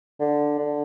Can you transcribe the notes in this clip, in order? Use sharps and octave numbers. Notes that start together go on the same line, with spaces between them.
D3
D3